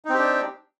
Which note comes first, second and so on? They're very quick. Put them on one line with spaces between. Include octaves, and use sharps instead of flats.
D#4 C4 G4 D4